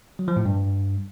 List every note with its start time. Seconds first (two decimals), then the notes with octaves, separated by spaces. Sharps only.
0.19 F#3
0.28 F3
0.37 A2
0.45 G2